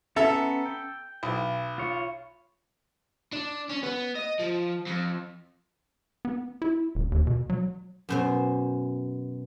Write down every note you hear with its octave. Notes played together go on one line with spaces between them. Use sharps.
B3 C#4 A4 E5 A#5
G5
B1
F4 C#5
D4
C#4
B3
D#5
F3
F2
B3
E4
D#1
D#2
B2
F#3
F#2 B2 C5